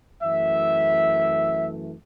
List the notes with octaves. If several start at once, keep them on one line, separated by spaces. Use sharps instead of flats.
F#2 E3 A3 E5